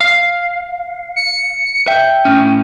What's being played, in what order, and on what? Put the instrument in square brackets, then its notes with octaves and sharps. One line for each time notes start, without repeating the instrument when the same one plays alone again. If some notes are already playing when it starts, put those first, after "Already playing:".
[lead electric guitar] F5
[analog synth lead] C#7
[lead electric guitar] E5 [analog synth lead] G5
[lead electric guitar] A2 C#4